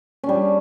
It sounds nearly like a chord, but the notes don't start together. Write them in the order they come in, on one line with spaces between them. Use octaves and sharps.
C#4 D4 G3